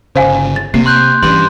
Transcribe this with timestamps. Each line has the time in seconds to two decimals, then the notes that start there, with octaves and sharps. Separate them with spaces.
0.16 G1 C#3 C5 F5 G#5
0.56 A6
0.74 C3 A#3 C7
0.86 C6 F#6 G6
1.23 G2 E3 C#4 C6